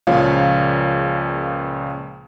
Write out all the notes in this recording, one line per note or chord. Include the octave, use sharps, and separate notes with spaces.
C#2 A#2 C#3 F3 C#5 F5